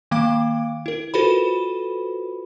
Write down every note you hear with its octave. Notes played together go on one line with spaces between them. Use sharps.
D#3 A#3 F5 D6 D7
E4 A#4
F4 F#4 A4 B4 C5 B5